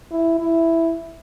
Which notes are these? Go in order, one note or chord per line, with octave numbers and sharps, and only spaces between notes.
E4
E4